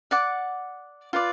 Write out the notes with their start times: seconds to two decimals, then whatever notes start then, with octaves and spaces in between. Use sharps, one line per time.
0.11 D5 F#5 D6
1.13 F4 B4 D5